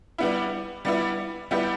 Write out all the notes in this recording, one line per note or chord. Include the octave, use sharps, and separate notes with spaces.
G3 B3 E4
G3 B3 E4
G3 B3 E4 G4